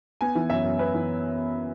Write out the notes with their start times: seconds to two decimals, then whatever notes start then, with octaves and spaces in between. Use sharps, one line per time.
0.21 B3 G#5
0.35 E3
0.50 F#2 E5
0.64 F#2
0.79 B3 B4
0.94 E3